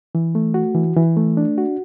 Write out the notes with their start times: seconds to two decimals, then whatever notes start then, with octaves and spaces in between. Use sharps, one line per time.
0.15 E3
0.35 A3
0.54 F#4
0.75 E3
0.96 E3
1.17 A3
1.37 D4
1.58 F#4